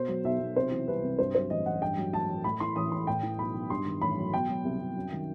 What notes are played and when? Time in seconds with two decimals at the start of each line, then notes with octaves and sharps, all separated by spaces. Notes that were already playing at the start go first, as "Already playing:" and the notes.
Already playing: B2 C5
0.08 F#3
0.24 B1 E5
0.40 B1
0.56 C3 C5
0.72 E3
0.87 C2 B4
1.03 C2
1.19 G2 C5
1.34 F#3 C5
1.50 A1 D#5
1.66 A1 F#5
1.81 G2 G5
1.98 F#3
2.13 A1 A5
2.29 A1
2.44 A2 B5
2.60 E3 C6
2.76 A1 D#6
2.92 A1 C6
3.07 A2 G5
3.23 E3
3.38 B1 B5
3.55 B1
3.70 G2 C6
3.86 D#3
4.02 A1 B5
4.18 F#3
4.33 B2 G5
4.49 F#3
4.64 C2
4.80 C2
4.96 F#2
5.12 D#3